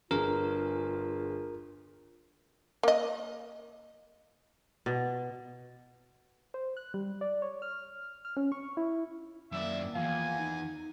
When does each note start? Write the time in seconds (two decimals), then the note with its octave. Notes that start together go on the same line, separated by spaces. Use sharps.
0.11 G1 F4 G#4 A#4
2.83 A#3 D#5
4.86 B2
6.54 C5
6.77 F#6
6.94 G3
7.21 D5
7.42 C#5
7.62 F6
8.25 F6
8.37 C#4
8.52 C#6
8.77 E4
9.52 F#2 D#3 A#3 D5 E5
9.95 E2 F3 F4 F5 G#5
10.39 D#4